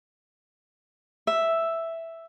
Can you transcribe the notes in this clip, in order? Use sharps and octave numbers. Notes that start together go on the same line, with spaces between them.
E5